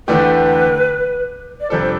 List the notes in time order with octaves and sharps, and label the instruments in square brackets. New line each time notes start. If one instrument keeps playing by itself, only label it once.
[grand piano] E2 D3 A3 D4 G4 [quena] B4
[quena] D5
[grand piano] F2 C3 G3 D4 A4 [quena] C5
[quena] C5